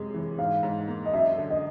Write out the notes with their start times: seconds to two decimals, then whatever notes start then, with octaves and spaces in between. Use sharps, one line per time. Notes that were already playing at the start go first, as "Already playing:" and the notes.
Already playing: F#2 C3 G#3
0.14 E3
0.38 G#2 F5
0.63 G#2
0.88 A#3
1.06 D#5
1.13 F#2 E5
1.38 D3
1.50 D#5